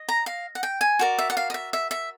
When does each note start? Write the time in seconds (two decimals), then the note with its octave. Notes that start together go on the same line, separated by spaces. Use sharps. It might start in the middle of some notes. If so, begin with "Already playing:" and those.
Already playing: D#5
0.09 A#5
0.26 F5
0.55 F#5
0.63 G5
0.81 G#5
0.99 F#4 A#4 D5
1.18 E5
1.30 F#5
1.37 F5
1.50 D#5
1.54 E5
1.73 E5
1.91 E5